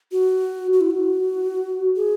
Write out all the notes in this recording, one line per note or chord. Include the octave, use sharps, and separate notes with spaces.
F#4
F#4
E4
F#4
G#4